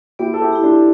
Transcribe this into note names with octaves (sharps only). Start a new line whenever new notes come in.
A#3 E4 G4
A4
E4 G4
E4 G4
D4 F4